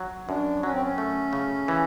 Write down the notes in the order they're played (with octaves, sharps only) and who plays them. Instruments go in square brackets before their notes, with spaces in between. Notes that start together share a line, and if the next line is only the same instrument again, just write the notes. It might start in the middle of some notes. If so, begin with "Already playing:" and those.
Already playing: [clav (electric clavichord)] F#3
[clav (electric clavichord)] F#2 [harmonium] D4
[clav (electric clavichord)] F#3 [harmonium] C#4
[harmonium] C4
C#4
[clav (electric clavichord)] A3
C#3
E3